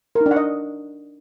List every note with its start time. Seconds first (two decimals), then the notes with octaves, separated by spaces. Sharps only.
0.15 A#4
0.21 D#4
0.26 D4
0.31 F#5
0.36 D#5